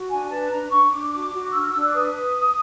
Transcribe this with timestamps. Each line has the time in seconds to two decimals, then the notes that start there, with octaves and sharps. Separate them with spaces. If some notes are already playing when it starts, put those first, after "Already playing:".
Already playing: F#4
0.09 D4 G#5
0.29 B4 A5
0.50 D4 A#5
0.70 D4 C#6
0.91 D4 D6
1.11 F#4 D6
1.32 F#4
1.53 D4 E6
1.61 F6
1.68 D4 E6
1.87 D6
1.94 B4 D#6